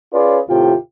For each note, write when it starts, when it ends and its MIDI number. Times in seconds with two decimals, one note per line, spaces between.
0.12 0.39 61
0.12 0.39 65
0.12 0.39 68
0.12 0.39 71
0.12 0.39 73
0.12 0.39 74
0.49 0.74 39
0.49 0.74 45
0.49 0.74 48
0.49 0.74 65
0.49 0.74 67
0.49 0.74 79